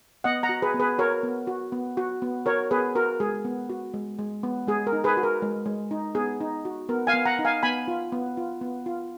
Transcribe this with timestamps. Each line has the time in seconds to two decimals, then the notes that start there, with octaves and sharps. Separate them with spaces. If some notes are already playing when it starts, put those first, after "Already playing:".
0.24 B3 D#5 F#5
0.43 F#5 A#5
0.49 F#4
0.62 G#4 B4
0.74 B3
0.80 G#4 B4
0.98 F#4 A#4 C#5
1.23 B3
1.47 F#4
1.72 B3
1.97 F#4
2.22 B3
2.46 F#4 A#4 C#5
2.71 B3 G#4 B4
2.96 F#4 A#4
3.20 G#3 G#4
3.45 B3
3.70 F#4
3.94 G#3
4.19 G#3
4.43 B3
4.67 G#3 G#4
4.87 A#4
4.93 D#4
5.04 G#4 B4
5.17 F#4
5.23 A#4
5.42 G#3
5.66 G#3
5.91 D#4
6.15 B3 G#4
6.41 D#4
6.65 F#4
6.89 B3 A#4
7.07 F5 G#5
7.13 B3
7.25 F#5 A#5
7.39 D#4
7.45 F5 G#5
7.63 B3 G#5 B5
7.88 F4
8.12 B3
8.37 F4
8.61 B3
8.86 F4